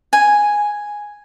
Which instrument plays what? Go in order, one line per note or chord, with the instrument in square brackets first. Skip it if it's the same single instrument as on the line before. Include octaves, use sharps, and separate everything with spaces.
[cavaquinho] G#5